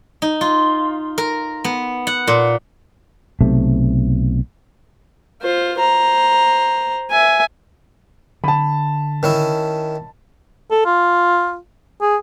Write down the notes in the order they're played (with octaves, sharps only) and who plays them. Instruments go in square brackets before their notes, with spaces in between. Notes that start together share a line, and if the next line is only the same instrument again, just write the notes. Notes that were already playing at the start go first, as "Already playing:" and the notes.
[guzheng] D#4
F4
A#4
B3
F#5
A#2
[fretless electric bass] B1 C3 A3
[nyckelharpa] F4 C5
C5 A#5
E5 G#5
[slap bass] D3 [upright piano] A5 B5
[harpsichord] D#3 C#4 E4
[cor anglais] A4
F4
G#4